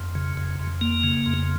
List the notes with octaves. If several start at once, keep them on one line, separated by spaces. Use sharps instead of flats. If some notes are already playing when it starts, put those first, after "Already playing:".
Already playing: F2
C#3
F2
F2
A#3
C#3
F2